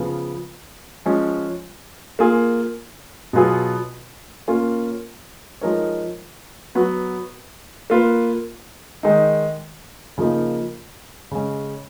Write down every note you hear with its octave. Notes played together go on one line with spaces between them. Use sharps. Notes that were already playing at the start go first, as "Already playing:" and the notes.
Already playing: C#3 F3 B3
F3 G#3 C#4
A#3 F4 G#4
B2 F#3 B3 F4 G#4
A#3 C#4 F4
F3 G#3 D#4 A#4 C#5
F#3 B3 F#4
A#3 F4 B4
D#3 G#3 D#4
C#3 F3 A#3 D#4
C#3 G#3 C#4